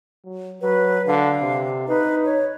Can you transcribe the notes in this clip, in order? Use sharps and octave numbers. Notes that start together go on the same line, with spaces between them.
F#3
F#3 B4
D3 F5
C3
D#4 B4
C#5